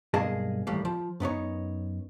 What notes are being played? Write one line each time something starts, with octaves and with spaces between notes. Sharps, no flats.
B1 G2 A#3 G#4 D#5 A5
D#2 A2 E3 G3 A#3
F3
F#2 B3 D#4 C#5